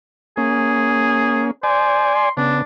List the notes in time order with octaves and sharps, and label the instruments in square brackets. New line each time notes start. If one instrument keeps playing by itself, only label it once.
[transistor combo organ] A#3 C#4 [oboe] G#4
[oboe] C5 [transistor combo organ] D5 G#5
[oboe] C6
[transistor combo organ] C#3 B3 [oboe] D4